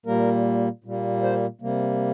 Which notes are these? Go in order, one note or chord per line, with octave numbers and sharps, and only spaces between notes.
A#2 G3 A#3 A#4
A#2 G3 A#3
C5
C3 G3 A#3